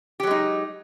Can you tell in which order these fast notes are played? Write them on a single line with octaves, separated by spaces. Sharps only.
G4 F#3 G#3 D#4